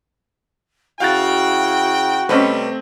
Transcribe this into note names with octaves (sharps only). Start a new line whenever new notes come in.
C#3 E4 F#4 F5 G5 F#6 A6
C3 G3 A3 C4 C#4 B4 D#5